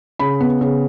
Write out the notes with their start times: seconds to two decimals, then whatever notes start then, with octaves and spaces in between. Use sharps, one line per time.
0.19 C#3 B5
0.40 B3
0.61 C#3